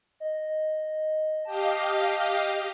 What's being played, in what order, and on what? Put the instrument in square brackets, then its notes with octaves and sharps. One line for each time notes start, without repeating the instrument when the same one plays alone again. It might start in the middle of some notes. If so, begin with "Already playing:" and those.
[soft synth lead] D#5
[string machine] G4 D#5 F5 [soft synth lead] A5